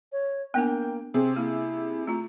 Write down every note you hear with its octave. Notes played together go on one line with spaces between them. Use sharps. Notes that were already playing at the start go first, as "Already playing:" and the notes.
C#5
A#3 B3 D4 G5 G#5
C3 C4 G#4
A#3 E4
A3 F4 A#5